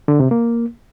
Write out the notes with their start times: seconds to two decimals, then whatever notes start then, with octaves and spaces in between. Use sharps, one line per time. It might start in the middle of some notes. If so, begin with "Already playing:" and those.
0.08 D3
0.20 C3
0.31 A#3